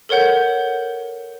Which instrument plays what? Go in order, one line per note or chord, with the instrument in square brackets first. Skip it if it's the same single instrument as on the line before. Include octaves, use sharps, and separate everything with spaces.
[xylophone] A4 A#4 C#5 F#5 G6